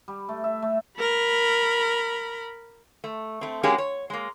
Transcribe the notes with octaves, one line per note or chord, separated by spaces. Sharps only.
G3
A3
E5
A3
A#4 B5
A3
A3 C4
F#3 G#3 A#3 C#4 G4 G#4
C#5
G#3 A#3